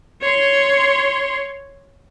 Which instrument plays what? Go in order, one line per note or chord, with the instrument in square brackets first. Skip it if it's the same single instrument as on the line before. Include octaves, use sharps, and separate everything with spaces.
[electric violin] C#5 C6